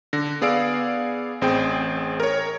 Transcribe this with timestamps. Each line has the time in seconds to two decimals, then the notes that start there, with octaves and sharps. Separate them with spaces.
0.13 D3 A#6
0.41 B3 G#4 D5 F5 E6 D7
1.41 A1 C4 G#4 G5
2.20 A#4 C#5